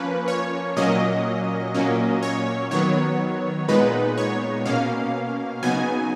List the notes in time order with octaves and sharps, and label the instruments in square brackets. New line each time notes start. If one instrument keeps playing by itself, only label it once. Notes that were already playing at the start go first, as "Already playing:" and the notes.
Already playing: [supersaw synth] F3 A#3 C#4 B4
C#5
A#2 F#3 A#3 C#4 D#5
A#2 F#3 A#3 C#4
C#5
D#3 F#3 B3 C#5
A#2 G#3 B3 D#4 B4
C#5
B2 A#3 C#4 F5
C#3 F#3 B3 D#4 G#5